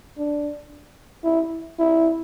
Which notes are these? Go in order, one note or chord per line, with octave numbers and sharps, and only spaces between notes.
D4
E4
E4